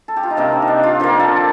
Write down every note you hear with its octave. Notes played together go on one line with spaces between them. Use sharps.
A4
G4
F4
D#4
C3 D#3 A#3 D4
C4
D#4
D4
F4
D3 F3 A#3
A4